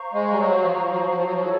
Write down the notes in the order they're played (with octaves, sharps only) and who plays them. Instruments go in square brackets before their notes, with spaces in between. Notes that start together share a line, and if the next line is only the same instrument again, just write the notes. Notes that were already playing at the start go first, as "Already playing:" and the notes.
Already playing: [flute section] C5 F5 A#5 C#6
[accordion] G#3
G3
F#3
F3
F#3
F3
F#3
F3
F#3
F3
F#3
F3
[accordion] F#3 [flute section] E4 A4 C#5